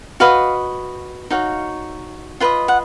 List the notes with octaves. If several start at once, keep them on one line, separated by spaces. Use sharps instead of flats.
F#4 B4 D#5 F5
D#4 F#4 C#5 F5
F4 B4 D#5 F#5
F#5